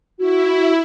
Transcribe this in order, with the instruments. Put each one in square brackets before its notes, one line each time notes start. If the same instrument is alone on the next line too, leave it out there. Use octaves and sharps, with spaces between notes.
[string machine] E4 [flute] F#4